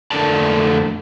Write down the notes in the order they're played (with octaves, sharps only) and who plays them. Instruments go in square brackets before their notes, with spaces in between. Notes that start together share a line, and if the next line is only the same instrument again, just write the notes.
[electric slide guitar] F2 D3 A3 A#4 D5 A5